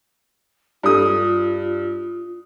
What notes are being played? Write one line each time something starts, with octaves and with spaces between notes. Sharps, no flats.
G2 F4 D#6